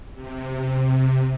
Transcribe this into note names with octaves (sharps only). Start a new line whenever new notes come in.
C3